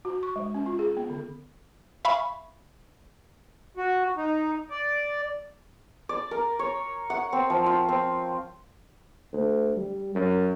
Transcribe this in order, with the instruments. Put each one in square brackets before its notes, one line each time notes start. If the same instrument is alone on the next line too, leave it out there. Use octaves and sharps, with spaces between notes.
[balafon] F#4
C#6
G#3
C#4
F4
G#4
B3
D3
[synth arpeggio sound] E5 F5 G#5 B5 C#6
[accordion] F#4
D#4
D5
[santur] D5
A#4
C#5
F#5
C4
F3
F4
C4
[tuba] D2
G3
F#2